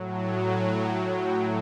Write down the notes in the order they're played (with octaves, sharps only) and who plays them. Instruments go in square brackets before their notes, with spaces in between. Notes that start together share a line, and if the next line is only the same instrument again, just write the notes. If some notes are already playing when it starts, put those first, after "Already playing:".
Already playing: [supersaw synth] A2 F#3
A5
G#5
G5
G5